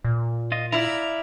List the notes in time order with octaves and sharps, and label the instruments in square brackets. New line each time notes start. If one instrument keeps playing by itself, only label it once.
[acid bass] A#2
[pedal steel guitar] F4 D#5
[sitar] E4 [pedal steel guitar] D5 F5 A#5